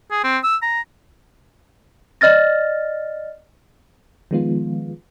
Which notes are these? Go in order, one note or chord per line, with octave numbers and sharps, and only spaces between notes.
G#4
C4
E6
A#5
D5 D#5 F6 A6 A#6
D#3 F3 G#3 B3 F4